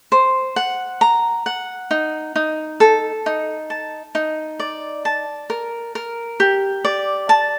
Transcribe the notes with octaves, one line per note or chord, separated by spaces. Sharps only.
C5
F#5
A#5
F#5
D#4
D#4
A4
D#4
A5
D#4
D5
A5
A#4
A#4
G4
D5
A5